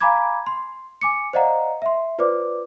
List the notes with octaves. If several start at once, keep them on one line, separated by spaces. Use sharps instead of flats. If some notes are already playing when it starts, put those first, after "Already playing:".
F5 G#5 A#5 B5 D6 G#6
C6
G#5 D6 C#7
C5 D5 D#5 F5 F#5 A#5
E5 C6
F4 B4 C5 D5 D6